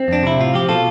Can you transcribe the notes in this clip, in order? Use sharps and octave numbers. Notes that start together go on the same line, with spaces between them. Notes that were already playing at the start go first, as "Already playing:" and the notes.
Already playing: C4
F2 D4
C3 E4
A2 F4
F3 G4
B2 F4 A4